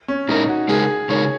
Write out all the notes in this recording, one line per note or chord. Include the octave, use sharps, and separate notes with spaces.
C#4
A#2 G#3 C#4 D#4 E4 A#4
F#4
C#3 G#3 D#4 G#4 A#4
C#3 G#3 D#4 A#4 C#5